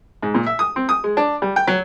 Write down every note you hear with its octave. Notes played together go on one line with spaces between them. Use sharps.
G#2
A#2
E5
D#6
C4
D#6
G#3
D4
G3
G5
F#3